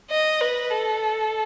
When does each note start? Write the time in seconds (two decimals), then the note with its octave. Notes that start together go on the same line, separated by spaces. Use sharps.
0.11 D#5
0.41 B4
0.71 A4